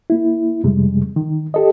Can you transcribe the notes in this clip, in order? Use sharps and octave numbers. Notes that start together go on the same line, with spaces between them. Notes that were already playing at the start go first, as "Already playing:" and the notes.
A#3 E4
F2 C3 G3 G#3
D#3
G4 A4 D#5